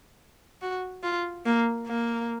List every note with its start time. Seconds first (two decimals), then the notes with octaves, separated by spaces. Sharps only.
0.62 F#4
1.03 F4
1.45 A#3
1.87 A#3